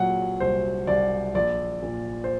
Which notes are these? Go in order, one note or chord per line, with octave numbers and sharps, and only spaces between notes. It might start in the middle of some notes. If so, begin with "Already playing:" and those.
Already playing: A#2 F#3 F#5
C2 C5
C2 D5
A#1 D5
A#2
C5